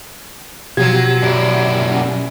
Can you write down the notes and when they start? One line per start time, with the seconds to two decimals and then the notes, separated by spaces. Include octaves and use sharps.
0.77 B2 F3 F#3 F#4 G4 G#6
1.22 F#2 E4 D5 D7